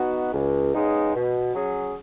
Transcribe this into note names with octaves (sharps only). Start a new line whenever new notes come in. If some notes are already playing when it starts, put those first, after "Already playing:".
Already playing: B3 D#4 F#4
C#2
C#3 G#3 B3 D#4
B2
F#3 C#4 G#4